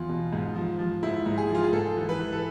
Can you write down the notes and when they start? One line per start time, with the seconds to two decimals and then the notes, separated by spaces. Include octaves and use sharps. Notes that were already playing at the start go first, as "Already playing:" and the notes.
Already playing: E2 F4
0.09 B2
0.33 G#2
0.56 F3
0.79 F3
1.03 G#2 E4
1.26 G#2
1.38 G#4
1.50 F3 F4
1.63 G#4
1.73 G#2 A4
1.97 E3
2.09 B4
2.20 E3
2.32 A4